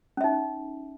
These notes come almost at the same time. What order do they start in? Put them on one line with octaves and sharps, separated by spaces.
C#4 E5 D#4